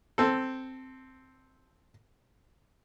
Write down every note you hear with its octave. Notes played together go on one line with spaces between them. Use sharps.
C4 A4